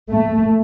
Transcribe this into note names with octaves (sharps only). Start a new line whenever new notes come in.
A3